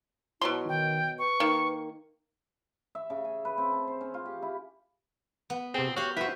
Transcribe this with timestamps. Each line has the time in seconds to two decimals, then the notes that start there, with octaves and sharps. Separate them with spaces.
0.41 B2 F#3 E4 C6
0.69 D#3 G5
1.19 B4 C#6
1.40 D#3 A#3
2.95 E5
3.10 C#3
3.25 G#5
3.45 B4
3.58 C4
3.72 A5
3.87 C5
4.01 C#4
4.14 F4
4.26 G4
4.42 E4
5.50 B3
5.74 C3 C4 G#4
5.96 F#4 G4 C#5 F5
6.17 E4 F#4 B4 C5 E5